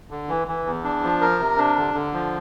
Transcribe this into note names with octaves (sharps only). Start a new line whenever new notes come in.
D3
E3
E3
E2
D4
F3
A#4
C3
D4
D3
D3
F3